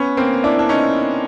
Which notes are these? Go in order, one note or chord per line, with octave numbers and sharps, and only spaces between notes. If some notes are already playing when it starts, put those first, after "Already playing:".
Already playing: B3 C#4
A#3 C4
D4 E4
D4
C#4 D#4